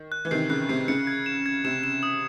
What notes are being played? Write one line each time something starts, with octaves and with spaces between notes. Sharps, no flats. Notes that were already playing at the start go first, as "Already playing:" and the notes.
Already playing: D#3
F#6
E3
C3 D#3 C7
C#3 F#6
C3 C7
C#3 C#7
G#6
E7
G#6
C3 E7
E7
D#6